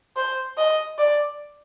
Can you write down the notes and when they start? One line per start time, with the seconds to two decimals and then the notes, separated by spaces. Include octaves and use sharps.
0.16 C5
0.58 D#5
0.98 D5